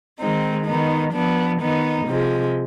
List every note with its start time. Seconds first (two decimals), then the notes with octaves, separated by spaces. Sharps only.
0.19 D#3 G#3 C4 D#4
0.66 D#3 B3 D#4
1.13 F3 B3 D4
1.60 D#3 B3 D#4
2.07 C3 F3 G#3